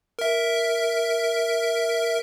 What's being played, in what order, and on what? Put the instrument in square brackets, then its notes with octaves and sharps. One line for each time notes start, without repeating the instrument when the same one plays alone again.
[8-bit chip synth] A#4 E5